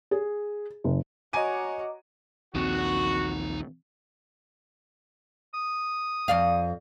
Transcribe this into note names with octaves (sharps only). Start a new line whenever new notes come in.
G#4
F#1
F#4 C#5 D#5 G#5 A#5 D6 D#7
A#1 D#2 C4 D#4 F#4 A5
D#6
F2 D5 F5